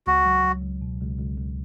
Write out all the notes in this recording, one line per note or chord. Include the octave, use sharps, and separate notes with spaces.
C#2 F#4
F#3
F#3
C#2
B2
C#2
C#2
C#2